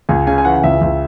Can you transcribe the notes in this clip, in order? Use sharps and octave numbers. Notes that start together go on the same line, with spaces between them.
C#2 G#5
C#3 G#5
G#5
E3 F#5
C#2 E5
C#2